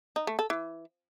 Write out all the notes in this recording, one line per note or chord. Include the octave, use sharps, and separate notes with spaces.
D#4
A3
A4
E3